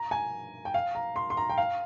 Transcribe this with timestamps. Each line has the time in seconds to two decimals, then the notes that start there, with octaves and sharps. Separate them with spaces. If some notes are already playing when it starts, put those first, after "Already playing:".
Already playing: A#5
0.11 G#5
0.65 G5
0.74 F5
0.95 A#5
1.16 C6
1.30 C6
1.37 A#5
1.50 G5
1.58 F5